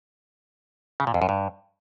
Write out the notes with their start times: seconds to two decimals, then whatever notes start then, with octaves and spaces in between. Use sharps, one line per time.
1.00 C#3
1.07 A#2
1.14 F2
1.22 F#2
1.29 G2